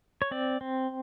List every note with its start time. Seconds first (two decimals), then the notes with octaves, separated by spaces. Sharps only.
0.22 C#5
0.31 C4 D5
0.61 C4